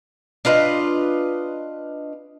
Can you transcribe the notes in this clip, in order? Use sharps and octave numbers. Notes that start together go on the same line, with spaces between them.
D4 F4 B4 D#5